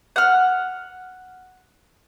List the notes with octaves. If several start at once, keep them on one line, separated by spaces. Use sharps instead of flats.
F#5 F6